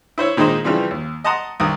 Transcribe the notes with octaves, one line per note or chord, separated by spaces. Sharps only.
E4 C5 C#5 E5
A#2 D#3 G#3 D#4 C5
C#3 E3 F3 G3 C4
D#2
D#5 F#5 A5 A#5 C6 D#6
C2 D#3 D#6